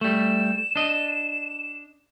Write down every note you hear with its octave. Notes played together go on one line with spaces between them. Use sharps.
G3 A3 E7
D4 D#5